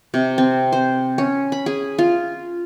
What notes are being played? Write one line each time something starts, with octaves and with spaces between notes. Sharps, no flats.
C3
C4
C5
C#4
B5
G#4
F4